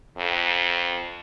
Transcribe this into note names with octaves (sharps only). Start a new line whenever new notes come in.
F2